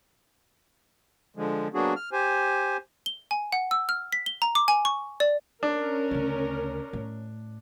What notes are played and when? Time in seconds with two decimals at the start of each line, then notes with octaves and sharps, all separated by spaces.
1.37 D3 F3 G#3
1.74 F#3 A#3 B3 D4 F#4 G#4
1.96 F6
2.12 G4 C5 G#5
3.06 G7
3.31 G#5
3.52 F#5
3.71 E6
3.89 F6
4.13 B6
4.26 G7
4.42 A#5
4.55 D6
4.68 G#5
4.85 C#6
5.20 D5
5.63 C#4 D4 A#4
6.11 D2 C#3
6.93 A2